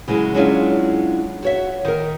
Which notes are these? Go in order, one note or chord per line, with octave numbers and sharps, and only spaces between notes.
C#3 F#3 G#3 E4
F#3 G#3 C#4 D4 E4 F4
F#4 C#5 E5
D#3 A#4